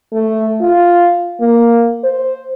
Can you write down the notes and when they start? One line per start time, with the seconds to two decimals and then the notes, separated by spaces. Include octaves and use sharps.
0.12 A3
0.61 F4
1.41 A#3
2.03 C5